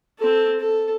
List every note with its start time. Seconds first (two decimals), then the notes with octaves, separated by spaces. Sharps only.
0.19 C4 A4
0.60 A4